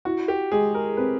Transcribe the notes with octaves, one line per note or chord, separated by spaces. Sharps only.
E4 F#4
G4
G#3 G#4
A#4
C4 B4